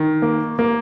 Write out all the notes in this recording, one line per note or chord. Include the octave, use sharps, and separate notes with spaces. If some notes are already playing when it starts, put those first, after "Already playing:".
Already playing: D#3
A#3
A#3